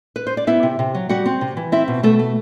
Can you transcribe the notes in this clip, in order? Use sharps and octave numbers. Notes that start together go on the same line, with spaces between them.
B4
C5
D5
B3 E4 E5
C3
C3
F#3
G3 F#4 F#5
C4
C3
E3
C4 E4 E5
B2
B2 A3 A4
A3